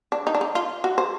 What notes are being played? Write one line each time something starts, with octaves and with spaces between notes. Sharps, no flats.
D4
D#4
D4
D#4
F4
F#4
C5